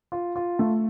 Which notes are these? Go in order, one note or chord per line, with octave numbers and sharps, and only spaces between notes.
F4
F4
A3